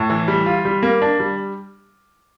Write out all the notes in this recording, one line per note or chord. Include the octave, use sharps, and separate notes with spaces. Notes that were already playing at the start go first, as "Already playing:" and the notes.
Already playing: A2
E3
G3
F4
G3
A#3
D4
G3